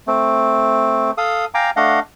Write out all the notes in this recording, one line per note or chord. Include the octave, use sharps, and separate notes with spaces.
A3 C4
A4 F5 D#6
F5 G5 G#5 A#5 D6
A3 D4 D#5 F5 F#5